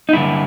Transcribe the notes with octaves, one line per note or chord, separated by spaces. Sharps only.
D#4
G2 D3 E4